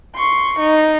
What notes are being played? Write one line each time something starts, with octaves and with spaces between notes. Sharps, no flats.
C6 C#6
D#4